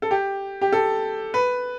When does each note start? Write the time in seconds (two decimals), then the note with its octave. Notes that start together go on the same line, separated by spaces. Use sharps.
0.02 A4
0.11 G4
0.61 G4
0.72 A4
1.34 B4